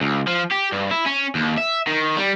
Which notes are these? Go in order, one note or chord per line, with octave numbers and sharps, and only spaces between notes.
C#2
F3
G4
G2
E4
C#4
D#2
E5
D#3
G3